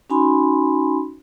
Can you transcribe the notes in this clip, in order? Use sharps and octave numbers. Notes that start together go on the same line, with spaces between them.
C#4 D#4 F#4 G#5 B5 C6